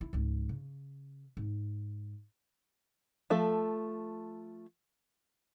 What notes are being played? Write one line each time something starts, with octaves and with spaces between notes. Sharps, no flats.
E4
C#2 G#2
C#3
G#2
F3 A3 A4